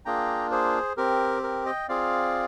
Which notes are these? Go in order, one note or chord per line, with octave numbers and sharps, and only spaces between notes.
A#3 D4 F4 G#4 G5 A#5
G#4 C5
C4 G4 A#4
A#4
D#5 G5
C4 F4 G#4 D5 F5